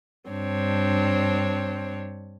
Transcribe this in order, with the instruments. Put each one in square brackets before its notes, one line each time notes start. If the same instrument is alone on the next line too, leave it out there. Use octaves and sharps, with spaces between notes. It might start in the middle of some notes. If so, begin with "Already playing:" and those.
[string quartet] G2 C4 D4 C#5